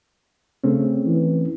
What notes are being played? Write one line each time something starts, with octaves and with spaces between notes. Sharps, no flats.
C#3 A3 C4 C#4
E3